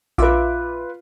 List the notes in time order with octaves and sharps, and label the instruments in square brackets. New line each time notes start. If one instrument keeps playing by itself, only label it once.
[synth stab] A#1 E5 D6 [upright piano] F4 B4